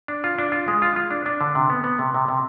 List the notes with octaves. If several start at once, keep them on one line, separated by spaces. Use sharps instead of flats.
D4
F4
D4
F4
G#3
F4
F4
D4
D4
D3
C3
B3
B3
C3
C3
C3